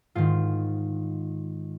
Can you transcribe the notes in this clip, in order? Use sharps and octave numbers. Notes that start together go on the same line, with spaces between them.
G#2 D#3 F4